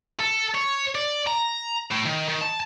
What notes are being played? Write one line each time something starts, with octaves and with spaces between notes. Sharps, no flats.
A4
C#5
D5
A#5
A2
D#3
D#3
A5